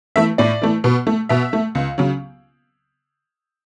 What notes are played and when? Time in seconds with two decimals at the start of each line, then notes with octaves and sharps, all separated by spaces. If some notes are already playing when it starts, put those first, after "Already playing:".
0.16 E3 A3 E5
0.38 A2 D5
0.62 E3 A3
0.84 B2
1.07 A3
1.29 B2 E5
1.53 A3
1.75 C#2
1.98 C#3 F#3